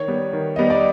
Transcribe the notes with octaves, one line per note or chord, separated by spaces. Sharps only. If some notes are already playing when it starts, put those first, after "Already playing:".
Already playing: D#3 C#5
G3 B3
D#3
G3 B3 D#5
D5